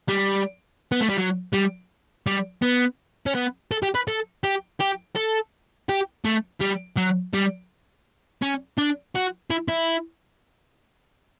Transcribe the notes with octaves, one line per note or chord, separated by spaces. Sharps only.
G3
B3
A3
G3
F#3
G3
G3
B3
C#4
B3
A4
G4
B4
A4
G4
G4
A4
G4
A3
G3
F#3
G3
C#4
D4
F#4
E4
E4